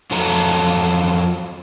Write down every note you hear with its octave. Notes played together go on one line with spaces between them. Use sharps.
F2 F3 F#3 F4 A4 A#5